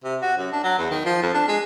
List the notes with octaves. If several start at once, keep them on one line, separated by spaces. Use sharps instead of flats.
C3
F#4
F#2
D4
F#3
E2
D#3
F3
F2
D4
G#3